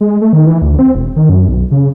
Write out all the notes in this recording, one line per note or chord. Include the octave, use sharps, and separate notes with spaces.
G#3
A3
D#3
E3
D2
C4
E1
D#3
F#2
B1
C#3